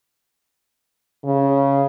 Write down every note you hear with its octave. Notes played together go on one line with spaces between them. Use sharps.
C#3